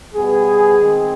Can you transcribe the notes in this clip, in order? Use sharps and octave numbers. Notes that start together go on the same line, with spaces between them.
B2 G3 B3 G#4
D#3 G#3 C4